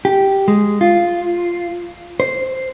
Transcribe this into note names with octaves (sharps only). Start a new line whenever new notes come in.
G4
G#3
F4
C5